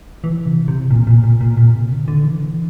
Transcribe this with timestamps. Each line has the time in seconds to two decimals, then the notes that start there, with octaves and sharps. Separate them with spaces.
0.24 E3
0.46 C3
0.68 C3
0.90 A#2
1.07 A#2
1.24 A#2
1.41 A#2
1.57 A#2
1.74 C3
1.91 D3
2.08 D3
2.24 E3